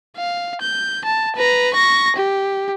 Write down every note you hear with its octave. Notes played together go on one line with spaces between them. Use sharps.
F5
G6
A5
B4 A#5
C#6 A#6
G4